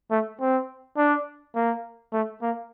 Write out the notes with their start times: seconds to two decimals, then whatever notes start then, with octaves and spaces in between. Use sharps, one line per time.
0.11 A3
0.40 C4
0.97 D4
1.55 A#3
2.13 A3
2.42 A#3